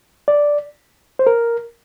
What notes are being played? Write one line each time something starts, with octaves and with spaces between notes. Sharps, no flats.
D5
C5
A#4